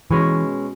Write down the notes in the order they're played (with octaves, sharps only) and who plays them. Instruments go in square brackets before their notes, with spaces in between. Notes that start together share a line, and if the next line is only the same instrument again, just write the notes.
[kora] B2 G#3 C#4 [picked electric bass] E3